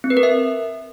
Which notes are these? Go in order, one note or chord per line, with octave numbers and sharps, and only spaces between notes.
C4
B4
A#4
E5